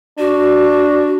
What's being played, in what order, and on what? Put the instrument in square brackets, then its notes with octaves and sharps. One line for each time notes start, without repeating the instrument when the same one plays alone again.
[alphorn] D4 [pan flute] F#4